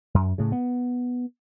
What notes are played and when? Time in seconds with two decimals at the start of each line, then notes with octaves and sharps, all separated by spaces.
0.14 F#2
0.38 A2 C#3
0.52 B3